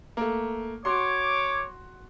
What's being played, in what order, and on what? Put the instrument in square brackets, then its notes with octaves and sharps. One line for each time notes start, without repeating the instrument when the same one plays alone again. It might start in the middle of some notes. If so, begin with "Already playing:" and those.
[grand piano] A3 A#3
[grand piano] F#4 C6 [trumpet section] C#5 D6